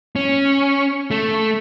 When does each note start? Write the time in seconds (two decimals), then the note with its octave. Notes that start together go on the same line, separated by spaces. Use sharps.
0.16 C#4
1.11 A3